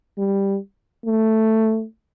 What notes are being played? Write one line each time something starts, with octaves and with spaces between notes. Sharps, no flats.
G3
A3